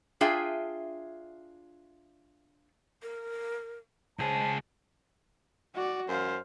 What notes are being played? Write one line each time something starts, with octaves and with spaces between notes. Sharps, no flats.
D4 F4 G#4 E5 G5 G#5
A#4
C#2 G#4 C5 A5
F#4 D5
F#2 C5 F5